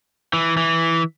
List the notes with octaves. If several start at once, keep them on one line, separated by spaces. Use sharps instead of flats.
E3
E3